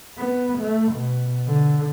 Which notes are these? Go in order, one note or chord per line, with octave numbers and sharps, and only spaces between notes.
B3
A3
B2
D3